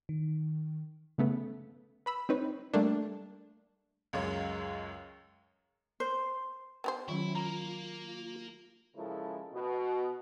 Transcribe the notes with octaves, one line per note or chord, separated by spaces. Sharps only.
D#3
C#3 A3 B3
B4 B5 E6
C4 D#4 B4 C#5
G3 A3 A#3 D4
C#2 F#2 G#3 C#5
C5
B3 G4 C5
D#3 F#3 C#4 E4 F4
A#3 A#5
C#3 F3 G#3 E4 A4 A#4
B2